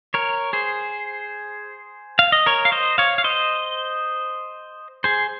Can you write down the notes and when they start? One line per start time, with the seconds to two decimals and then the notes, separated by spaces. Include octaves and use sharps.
0.14 A#4 C#5
0.53 G#4 C5
2.19 F5
2.32 D#5
2.46 A#4 C#5
2.65 F5
2.72 C5 D#5
2.98 C#5 F5
3.18 F5
3.24 C5 D#5
5.04 G#4 C5